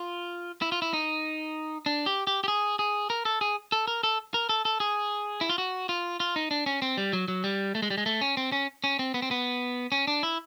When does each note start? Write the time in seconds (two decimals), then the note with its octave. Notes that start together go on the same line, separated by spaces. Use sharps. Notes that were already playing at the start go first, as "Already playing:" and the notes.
Already playing: F4
0.62 E4
0.72 F4
0.82 E4
0.93 D#4
1.86 D4
2.06 G4
2.27 G4
2.44 G4
2.48 G#4
2.79 G#4
3.10 A#4
3.25 A4
3.41 G#4
3.72 A4
3.87 A#4
4.03 A4
4.34 A#4
4.49 A4
4.65 A4
4.80 G#4
5.41 E4
5.50 F4
5.58 F#4
5.89 F4
6.20 F4
6.36 D#4
6.51 D4
6.66 C#4
6.82 C4
6.97 G3
7.13 F#3
7.28 F#3
7.44 G3
7.75 A3
7.82 G#3
7.90 G3
7.98 G#3
8.06 A3
8.21 C#4
8.37 C4
8.52 C#4
8.84 C#4
8.99 C4
9.14 B3
9.22 C4
9.31 B3
9.92 C#4
10.07 D4
10.23 E4